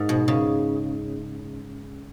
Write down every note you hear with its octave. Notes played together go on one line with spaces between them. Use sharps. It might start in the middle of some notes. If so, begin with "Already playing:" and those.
Already playing: G#2
B2
C#3